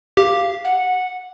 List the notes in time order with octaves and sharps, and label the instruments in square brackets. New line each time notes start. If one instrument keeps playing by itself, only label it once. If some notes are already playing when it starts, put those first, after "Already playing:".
[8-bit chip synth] G4 [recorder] F5
[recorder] F#5